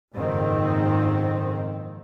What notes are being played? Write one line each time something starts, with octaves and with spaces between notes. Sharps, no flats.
F#1 F2 G#2 D#3 C4